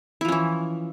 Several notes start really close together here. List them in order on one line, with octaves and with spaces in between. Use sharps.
E4 F3 C#4 E3